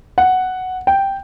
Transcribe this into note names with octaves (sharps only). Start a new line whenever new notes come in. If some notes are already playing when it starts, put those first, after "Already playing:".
F#5
G5